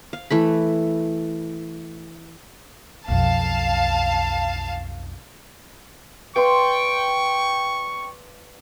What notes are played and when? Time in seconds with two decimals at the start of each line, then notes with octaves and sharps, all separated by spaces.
0.13 F5
0.30 E3 A3 B5
3.08 B1 F2 F5 A5
6.36 B4 D5 F5 G5 C6 C#6